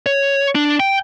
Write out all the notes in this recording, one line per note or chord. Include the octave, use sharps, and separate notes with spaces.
C#5
D4
G5